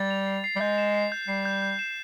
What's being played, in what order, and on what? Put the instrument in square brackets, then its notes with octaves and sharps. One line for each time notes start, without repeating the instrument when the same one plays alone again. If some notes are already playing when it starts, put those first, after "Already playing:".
Already playing: [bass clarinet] G3 [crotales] A6
[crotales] F7
C7
C7
[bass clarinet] G3
[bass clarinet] G#3 [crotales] G6
[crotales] E7
C7
G6
[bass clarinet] G3 [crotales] C7
[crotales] G6
G6
E7